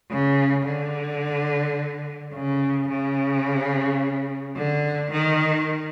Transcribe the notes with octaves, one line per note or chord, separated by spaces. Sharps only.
C#3
D3
C#3
C#3
D3
D#3